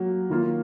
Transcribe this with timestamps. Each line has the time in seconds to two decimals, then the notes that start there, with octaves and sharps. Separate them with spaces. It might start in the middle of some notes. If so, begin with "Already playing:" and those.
Already playing: F#3 A#3
0.30 D#3 A#3 F4